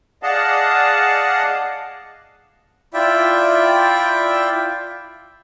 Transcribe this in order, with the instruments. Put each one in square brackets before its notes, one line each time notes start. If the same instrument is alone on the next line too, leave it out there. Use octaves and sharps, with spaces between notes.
[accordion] G#4 D5 D#5 F5 F#5 A5
[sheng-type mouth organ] E4 F4 D5 E5 G5